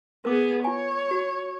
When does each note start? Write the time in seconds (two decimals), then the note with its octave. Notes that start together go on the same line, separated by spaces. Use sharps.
0.25 B3 G#4 A#4 D6
0.64 F4 C#5 G#5
1.11 F#4